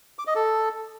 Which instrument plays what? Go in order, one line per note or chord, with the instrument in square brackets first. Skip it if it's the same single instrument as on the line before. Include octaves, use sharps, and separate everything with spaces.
[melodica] D6
D#5
A4